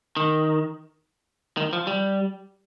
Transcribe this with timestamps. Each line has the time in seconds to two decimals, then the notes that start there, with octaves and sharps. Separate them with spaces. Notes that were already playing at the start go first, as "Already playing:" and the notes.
0.17 D#3
1.57 D#3
1.73 F3
1.87 G3